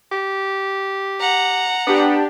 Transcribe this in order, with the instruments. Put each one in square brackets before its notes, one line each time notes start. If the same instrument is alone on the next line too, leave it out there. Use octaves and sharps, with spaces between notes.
[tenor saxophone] G4
[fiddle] F#5 A#5
[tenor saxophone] B3 [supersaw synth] D4 G4